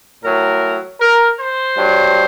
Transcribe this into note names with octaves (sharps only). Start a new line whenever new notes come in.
A2 F#3 A#4
A#4
C5
G2 F#3